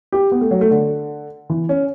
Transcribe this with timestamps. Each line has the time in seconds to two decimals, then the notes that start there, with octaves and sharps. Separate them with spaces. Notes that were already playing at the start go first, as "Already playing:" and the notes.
0.12 G4
0.32 B3
0.41 A3
0.51 F#3
0.61 A3
0.71 D3
1.50 E3
1.69 C#4